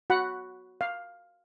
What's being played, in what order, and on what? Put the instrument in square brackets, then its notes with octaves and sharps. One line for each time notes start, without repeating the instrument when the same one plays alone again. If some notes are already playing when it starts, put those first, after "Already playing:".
[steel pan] F#4 F#5 B5
F5